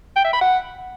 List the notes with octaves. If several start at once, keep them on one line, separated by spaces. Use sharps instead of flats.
G5
E5
B5
F#5